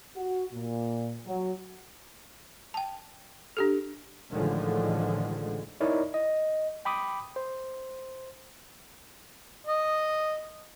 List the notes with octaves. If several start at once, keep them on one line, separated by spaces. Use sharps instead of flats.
F#4
A#2
F#3
G5 A5
D4 G4 A4
A1 A2 D3 D#3 F3 G#3
D#4 E4 A#4 C#5 D5
D#5
G5 B5 D6 D#6
C5
D#5